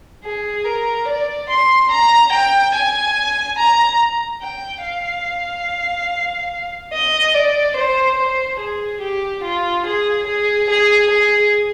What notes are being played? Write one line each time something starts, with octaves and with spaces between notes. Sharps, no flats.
G#4
A#4
D5
C6
A#5
G5
G#5
A#5
G5
F5
D#5
D5
C5
C5
G#4
G4
F4
G#4
G#4
G#4
G#4